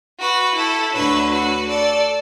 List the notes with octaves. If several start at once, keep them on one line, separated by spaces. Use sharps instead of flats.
F#4 B4
E4 A4
D2 D3 F#3 B4 E5
F#4 B4
A4 D5